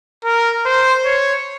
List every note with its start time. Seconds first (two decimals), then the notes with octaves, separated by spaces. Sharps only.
0.25 A#4
0.66 C5
1.05 C#5